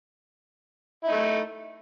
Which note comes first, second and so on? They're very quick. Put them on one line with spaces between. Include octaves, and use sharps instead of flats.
E4 D#4 A3